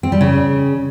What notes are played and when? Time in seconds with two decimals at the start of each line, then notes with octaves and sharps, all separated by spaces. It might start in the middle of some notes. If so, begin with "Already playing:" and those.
0.03 C4
0.12 G3
0.21 C#3